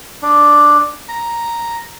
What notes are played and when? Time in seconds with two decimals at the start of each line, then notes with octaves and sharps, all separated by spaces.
0.23 D4
1.09 A#5